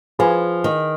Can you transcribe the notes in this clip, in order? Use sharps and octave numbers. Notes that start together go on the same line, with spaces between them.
F3 G#4 B4 F5 G#5
D#3